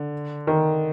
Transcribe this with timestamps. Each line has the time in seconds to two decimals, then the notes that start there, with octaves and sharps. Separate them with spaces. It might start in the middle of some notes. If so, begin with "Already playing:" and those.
Already playing: D3
0.47 D#3